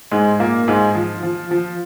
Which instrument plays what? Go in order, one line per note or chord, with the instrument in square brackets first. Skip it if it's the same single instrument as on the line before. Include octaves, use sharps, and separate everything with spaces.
[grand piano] G#2 G#3
A#2 A#3
G#2 G#3
F3
F3
F3